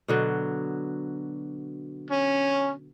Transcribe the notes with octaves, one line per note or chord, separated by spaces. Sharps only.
B2 D3 F#3
C#4